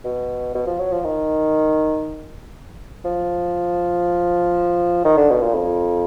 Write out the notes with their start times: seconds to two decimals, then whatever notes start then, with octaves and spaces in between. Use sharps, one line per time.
0.05 B2
0.55 B2
0.67 F3
0.79 F#3
0.92 F3
1.05 D#3
3.05 F3
5.05 D#3
5.17 D3
5.30 B2
5.43 A#2
5.55 F2